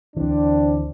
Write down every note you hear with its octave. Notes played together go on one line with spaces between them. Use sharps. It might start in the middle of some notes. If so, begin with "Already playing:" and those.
D2 E3 C4 D4